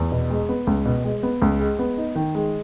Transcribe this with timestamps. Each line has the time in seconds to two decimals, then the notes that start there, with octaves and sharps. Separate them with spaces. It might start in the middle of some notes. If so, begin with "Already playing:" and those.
Already playing: E2
0.12 B2
0.30 G#3
0.49 B3
0.67 C#2
0.85 B2
1.04 G#3
1.23 B3
1.42 C#2
1.60 G#3
1.79 B3
1.98 D#4
2.15 D#3
2.35 G#3